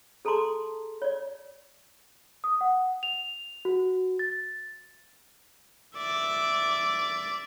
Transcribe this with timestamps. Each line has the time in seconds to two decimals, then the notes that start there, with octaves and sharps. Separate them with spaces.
0.25 G#4 A4 A5 A#5 C6 D6
1.02 C#5 D5
2.44 D#6
2.61 F#5
3.03 F7
3.65 F#4
4.19 A6
5.97 D5 E5